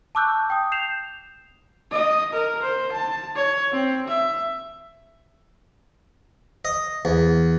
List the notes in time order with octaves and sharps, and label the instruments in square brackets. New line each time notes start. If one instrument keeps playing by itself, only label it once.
[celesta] A5 C#6 D6 E6 F#6 G6
G5 D#6
G6 C7 E7 F7
[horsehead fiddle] D#5
A#4
C5
A5
C#5
C4
E5
[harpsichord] D#5
E2